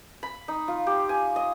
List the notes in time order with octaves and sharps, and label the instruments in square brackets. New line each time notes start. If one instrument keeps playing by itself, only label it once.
[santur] B5
D#4
F4
G4
G#5
D#5